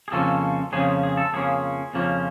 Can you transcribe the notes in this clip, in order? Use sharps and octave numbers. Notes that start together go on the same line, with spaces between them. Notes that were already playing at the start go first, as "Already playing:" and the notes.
G#4
F2 C#3 F3 A#3 C#4 A4
F2 C#3 F3 A#3 C#4 G#4
G#4
A4
F2 C#3 F3 A#3 C#4 G#4
F2 C#3 F3 A#3 C#4